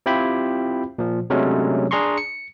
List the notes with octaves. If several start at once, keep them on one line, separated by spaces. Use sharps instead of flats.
C4 E4 F4 G4 G5 B5
A#2 F3
C3 F#3 G#3 A3 C#4 D4
D4 G#4 A#5 C6 C#6
C#7